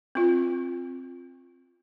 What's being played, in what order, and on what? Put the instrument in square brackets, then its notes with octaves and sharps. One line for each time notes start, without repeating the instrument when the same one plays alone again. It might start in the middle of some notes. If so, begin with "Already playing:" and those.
[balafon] C4 F4